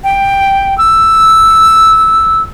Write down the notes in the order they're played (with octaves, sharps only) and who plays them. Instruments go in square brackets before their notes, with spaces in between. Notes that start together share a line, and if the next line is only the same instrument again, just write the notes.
[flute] G5
E6